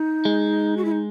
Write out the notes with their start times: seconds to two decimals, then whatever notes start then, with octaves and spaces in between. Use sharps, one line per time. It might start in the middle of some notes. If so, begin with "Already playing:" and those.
Already playing: D#4
0.25 G#3
0.77 F#4
0.85 E4
0.92 D#4